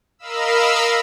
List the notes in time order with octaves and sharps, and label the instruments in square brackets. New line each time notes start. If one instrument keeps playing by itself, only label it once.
[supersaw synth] A#4 D#5 F5 B5 E6